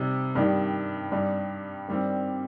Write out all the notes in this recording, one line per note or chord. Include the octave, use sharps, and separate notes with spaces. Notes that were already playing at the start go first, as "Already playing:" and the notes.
Already playing: C3 G3 D#4
G2 D#3 G3 D#4
G2 G3 D#4
G2 D#3 G3 C4